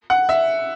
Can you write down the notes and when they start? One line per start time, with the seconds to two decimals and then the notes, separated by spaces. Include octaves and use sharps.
0.10 F#5
0.29 E5